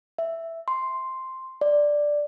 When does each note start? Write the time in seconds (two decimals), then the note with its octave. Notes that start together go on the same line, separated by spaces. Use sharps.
0.18 E5
0.68 C6
1.61 D5